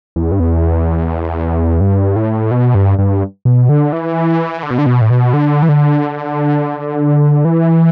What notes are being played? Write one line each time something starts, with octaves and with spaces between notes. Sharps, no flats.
E2
G2
E2
G2
A2
B2
G2
G2
B2
D3
E3
D3
B2
D3
B2
A2
B2
D3
E3
D3
E3